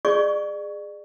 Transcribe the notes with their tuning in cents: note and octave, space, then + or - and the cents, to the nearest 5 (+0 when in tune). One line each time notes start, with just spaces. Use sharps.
G#4 -10 D5 +30 C#6 +10